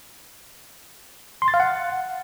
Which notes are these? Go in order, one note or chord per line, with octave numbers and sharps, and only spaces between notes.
C6
A6
F5
F#5